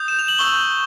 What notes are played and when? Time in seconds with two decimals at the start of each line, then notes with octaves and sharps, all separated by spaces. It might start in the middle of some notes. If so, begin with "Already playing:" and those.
Already playing: D#6 G6
0.08 E7
0.19 F7
0.28 F#7
0.38 C#6 E6 G6 G7